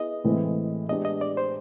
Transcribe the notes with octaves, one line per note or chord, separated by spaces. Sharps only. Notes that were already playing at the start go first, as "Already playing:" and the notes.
Already playing: B3 E4 G#4 D#5
A2 E3 G#3 C4
G#3 B3 D4 G4 D#5
D#5
D5
C5